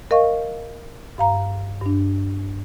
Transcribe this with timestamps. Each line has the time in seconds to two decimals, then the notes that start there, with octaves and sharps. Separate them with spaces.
0.11 A#4 D#5 F5 C#6
1.18 G2 F5 A#5
1.81 G2 D4